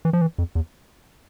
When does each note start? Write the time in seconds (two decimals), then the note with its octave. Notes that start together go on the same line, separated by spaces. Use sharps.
0.05 E3
0.13 F3
0.21 E3
0.38 F2
0.55 E2